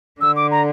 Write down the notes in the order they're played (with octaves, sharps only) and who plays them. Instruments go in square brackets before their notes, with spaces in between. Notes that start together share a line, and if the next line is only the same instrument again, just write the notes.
[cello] D3 [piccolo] E6
[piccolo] D6
A#5